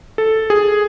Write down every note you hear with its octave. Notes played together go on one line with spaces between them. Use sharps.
A4
G#4